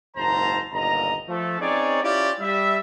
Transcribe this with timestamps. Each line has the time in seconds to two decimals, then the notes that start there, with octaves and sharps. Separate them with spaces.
0.17 F#1 D#2 G#2 C5 A5 A#5
0.72 G1 D#2 A#2 D#5 A#5
1.28 F3 A3 A4
1.60 C4 C#4 D#4 G#4 C#5 D5
2.03 C#4 E4 F4 G4 D5
2.39 G3 E5